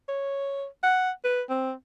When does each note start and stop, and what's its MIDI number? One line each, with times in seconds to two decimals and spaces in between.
0.09 0.65 73
0.83 1.10 78
1.24 1.42 71
1.50 1.73 60